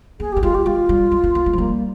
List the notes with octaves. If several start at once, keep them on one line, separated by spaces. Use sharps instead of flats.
A#3 G#4
A#3 G4
G#3 F4
G4
G#3 F4
G3
G#3
A#3
A#3
G#3
F3
G3 A#3